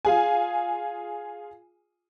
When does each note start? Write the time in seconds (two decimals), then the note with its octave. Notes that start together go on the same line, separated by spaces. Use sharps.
0.05 F4 G#4 G#5